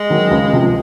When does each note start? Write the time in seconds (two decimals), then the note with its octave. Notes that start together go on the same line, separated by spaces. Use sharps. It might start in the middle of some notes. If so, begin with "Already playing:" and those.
Already playing: G#3
0.10 D#3 F#3
0.31 C#2
0.53 C3 F3